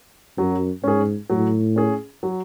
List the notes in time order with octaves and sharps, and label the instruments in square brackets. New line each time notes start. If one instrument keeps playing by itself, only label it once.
[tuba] F#2 [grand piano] F#3
[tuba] G#2 [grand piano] C#4 G#4
[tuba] A2 [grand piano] F#3
[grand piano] C#4 G#4
F#3